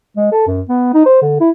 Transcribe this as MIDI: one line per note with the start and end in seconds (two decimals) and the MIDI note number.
0.17 0.28 56
0.32 0.46 69
0.47 0.62 42
0.69 0.93 59
0.94 1.03 63
1.05 1.21 72
1.22 1.37 50
1.40 1.50 64